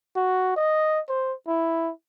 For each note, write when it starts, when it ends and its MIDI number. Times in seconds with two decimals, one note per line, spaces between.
0.16 0.56 66
0.56 1.00 75
1.09 1.34 72
1.47 1.91 64